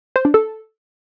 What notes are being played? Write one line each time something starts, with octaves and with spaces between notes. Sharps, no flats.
C5
D4
A4